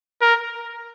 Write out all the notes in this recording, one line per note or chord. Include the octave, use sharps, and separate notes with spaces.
A#4